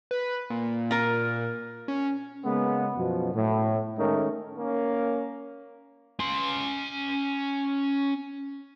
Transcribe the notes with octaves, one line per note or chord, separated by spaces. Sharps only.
B4
A#2
F4 A#4
C#4
C#3 G#3 A#3 B3
F#2 B2 F3
A2
D#3 G#3 A3 C#4 D#4 A#4
A#3 C#4
C#4 C6